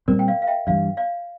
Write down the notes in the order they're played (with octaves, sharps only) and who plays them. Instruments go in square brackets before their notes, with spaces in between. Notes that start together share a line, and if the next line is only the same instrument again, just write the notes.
[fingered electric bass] A#2 G3 C4 [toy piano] A#4 D5
[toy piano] G5
D5 F5
F5
E5 G5
[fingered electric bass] G2 E3 G3 [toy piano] D5 F5
[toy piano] D5 F5